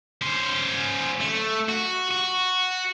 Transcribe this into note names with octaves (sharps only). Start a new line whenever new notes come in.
C#4 C5
A3
F#4
F#4